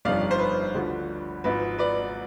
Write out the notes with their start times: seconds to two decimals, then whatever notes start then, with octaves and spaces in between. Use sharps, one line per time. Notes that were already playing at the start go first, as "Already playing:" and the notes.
0.05 G1 F2 D#3 D5 F5
0.31 C5
0.39 B4
0.74 D2 D3 F3
1.44 G#1 G#2 F3 B4
1.78 B4 D5